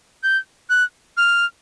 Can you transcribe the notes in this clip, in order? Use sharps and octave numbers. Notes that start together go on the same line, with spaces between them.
G6
F#6
F6